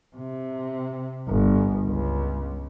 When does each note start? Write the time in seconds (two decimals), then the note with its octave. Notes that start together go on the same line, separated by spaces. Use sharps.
0.16 C3
1.28 G1
1.85 C#2